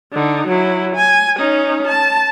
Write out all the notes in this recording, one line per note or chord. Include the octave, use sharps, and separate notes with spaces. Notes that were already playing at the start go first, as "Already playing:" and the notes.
D3 D#4
F#3 E4
G#5
C#4 D#4
A5